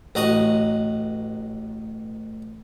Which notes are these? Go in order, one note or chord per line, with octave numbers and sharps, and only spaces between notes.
A1 D#4 F#4 D#5 D#6